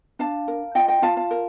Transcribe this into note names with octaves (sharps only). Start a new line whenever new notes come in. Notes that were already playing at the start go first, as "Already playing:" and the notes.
D4 F5 A5
A#4
F4 D#5 G5
D#5 G5
F4 F5 A5
F5 A5
A#4